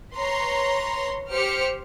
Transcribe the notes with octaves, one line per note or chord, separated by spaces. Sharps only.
B4 C#5 A#5 C6
G4 C5 F6 C#7